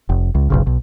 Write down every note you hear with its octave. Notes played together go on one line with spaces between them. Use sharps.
F1
C#2
F#1 B1 C#3
B1